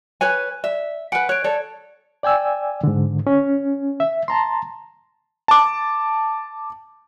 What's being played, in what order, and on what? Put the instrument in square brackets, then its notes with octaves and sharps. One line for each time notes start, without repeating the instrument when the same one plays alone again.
[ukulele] B4 C#5 G#5
[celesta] D5 [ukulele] E5
[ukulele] B4 F#5 [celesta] G#5 D7
[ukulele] C#5 [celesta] F#6 D7
[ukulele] A4 C#5 [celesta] D5
[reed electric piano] D5 G5 G#5 E6
G#2 D3
C#4
E5
A5 A#5 C6
[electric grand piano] A5 D6